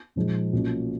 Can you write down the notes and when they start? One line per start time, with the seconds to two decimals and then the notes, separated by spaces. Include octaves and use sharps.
0.16 A#2 F3 G#3 D#4
0.53 B1 B2 A#3 C#4 F4